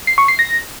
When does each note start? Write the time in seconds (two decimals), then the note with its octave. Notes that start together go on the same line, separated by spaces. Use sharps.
0.07 C7
0.18 C#6
0.28 C7
0.39 A#6